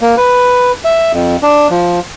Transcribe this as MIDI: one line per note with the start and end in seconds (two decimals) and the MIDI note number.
0.01 0.15 58
0.17 0.72 71
0.85 1.12 76
1.13 1.37 41
1.43 1.68 62
1.70 2.00 53